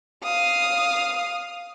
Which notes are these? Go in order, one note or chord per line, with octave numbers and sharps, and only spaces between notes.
F5 D#6